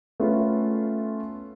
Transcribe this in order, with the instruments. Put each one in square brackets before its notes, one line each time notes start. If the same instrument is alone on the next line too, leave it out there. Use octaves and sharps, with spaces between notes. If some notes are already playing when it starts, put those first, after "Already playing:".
[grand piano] A3 B3 C#4 F4